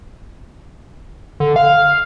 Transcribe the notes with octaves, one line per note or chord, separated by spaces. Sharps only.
D3
F5